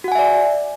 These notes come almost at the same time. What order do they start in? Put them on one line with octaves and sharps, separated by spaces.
F#4 F#5 G#5 E5 D5